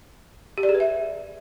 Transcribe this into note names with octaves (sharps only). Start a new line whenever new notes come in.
G4
D5
G#4
B4
E5